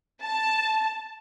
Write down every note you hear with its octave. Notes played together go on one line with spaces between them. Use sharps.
A5